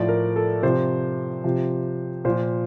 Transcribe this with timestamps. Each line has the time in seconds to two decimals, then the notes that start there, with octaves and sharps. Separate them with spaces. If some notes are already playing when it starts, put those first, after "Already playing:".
Already playing: A2 F3 D5
0.09 A#4
0.36 A4
0.63 C3 F3 C5
1.44 C3 F3
2.25 A#2 F3 C5